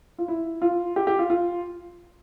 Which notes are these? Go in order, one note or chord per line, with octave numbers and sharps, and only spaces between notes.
F4
E4
F4
G4
G4
F4
F4